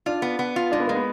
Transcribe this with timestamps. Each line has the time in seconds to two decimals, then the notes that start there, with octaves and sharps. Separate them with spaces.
0.06 D4 F4
0.22 B3
0.39 B3
0.56 F4
0.72 G#3 D4
0.80 B3
0.87 G#3 A#3
0.95 B3